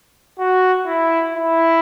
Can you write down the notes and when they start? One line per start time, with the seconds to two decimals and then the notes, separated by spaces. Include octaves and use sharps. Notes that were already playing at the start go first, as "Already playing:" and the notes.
0.39 F#4
0.86 E4
1.34 E4